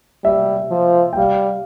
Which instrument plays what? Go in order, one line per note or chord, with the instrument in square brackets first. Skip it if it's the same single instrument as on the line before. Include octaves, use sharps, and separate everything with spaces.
[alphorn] G3 [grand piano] E5
[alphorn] F3
[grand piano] G5
[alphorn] G3 [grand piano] F5